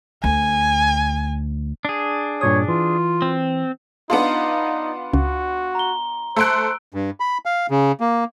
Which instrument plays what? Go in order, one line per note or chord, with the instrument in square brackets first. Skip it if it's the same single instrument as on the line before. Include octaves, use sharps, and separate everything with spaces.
[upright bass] D2 [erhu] G#5
[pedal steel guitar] D4 G#4
[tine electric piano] G2 A#2 D#6 [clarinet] C#5
[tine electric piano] E3 [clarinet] F4
[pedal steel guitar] C4
[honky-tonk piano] B3 D4 F4 [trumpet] D#4 [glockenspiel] C6
[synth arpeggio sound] C#2 [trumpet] F#4
[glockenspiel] A#5 G7
[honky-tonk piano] A3 C6 F#6 [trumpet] C5 [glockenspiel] E6 D7
[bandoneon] G2
B5
F5
C#3
A#3